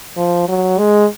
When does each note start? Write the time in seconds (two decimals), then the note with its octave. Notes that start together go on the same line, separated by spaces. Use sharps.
0.17 F3
0.48 F#3
0.78 G#3